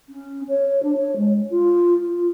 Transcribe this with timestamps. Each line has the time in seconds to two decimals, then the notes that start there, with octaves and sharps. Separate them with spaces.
0.09 C#4
0.48 C#5
0.83 D4
0.97 C#5
1.16 G#3
1.50 F4
2.06 F4